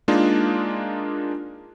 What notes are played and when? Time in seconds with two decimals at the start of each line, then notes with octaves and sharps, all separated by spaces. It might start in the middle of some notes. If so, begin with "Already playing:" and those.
0.08 G#3 A#3 D4 D#4 F4